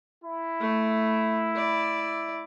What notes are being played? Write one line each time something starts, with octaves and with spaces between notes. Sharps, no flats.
E4
A3
D5